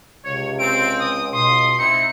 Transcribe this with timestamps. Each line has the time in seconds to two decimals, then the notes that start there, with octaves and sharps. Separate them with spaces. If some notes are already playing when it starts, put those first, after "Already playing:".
0.24 C#2 C3 C#5
0.59 C4 D7
0.99 D#6
1.32 B2 C6 D#6
1.79 C4 D#4 E4 C#7